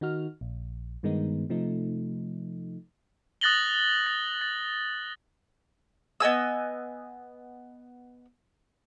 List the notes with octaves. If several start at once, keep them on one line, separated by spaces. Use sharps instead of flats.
D#3 D#4 F#4 F6
A#1
G2 D#3 G#3 B3 D#4
C3 F3 A3 D#4
D#6 F#6 A6 A#6 F#7 G7
A6
A6
B3 D#5 G#5 E6